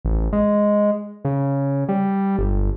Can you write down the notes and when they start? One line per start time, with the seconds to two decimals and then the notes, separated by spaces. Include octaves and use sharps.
0.05 A1
0.33 G#3
1.25 C#3
1.89 G3
2.39 G1